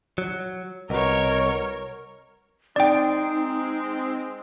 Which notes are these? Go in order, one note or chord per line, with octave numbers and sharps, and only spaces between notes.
F#3
C2 B2 A#4 C#5
G#3 C4 D#4 D5 G5